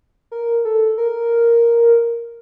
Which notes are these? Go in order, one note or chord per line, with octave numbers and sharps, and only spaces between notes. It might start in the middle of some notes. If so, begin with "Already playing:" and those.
A#4
A4
A#4